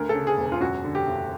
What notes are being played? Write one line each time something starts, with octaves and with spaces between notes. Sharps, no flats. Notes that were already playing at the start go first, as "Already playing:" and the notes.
Already playing: D2 A#4
A4
C#3
G#4
E1
F4
F#2 F#4
D3
G4
F#1